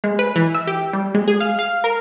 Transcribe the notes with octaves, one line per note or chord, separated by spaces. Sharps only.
G#3
B4
E3
E5
G4
G3
G#3
G#4
F5
F5
A#4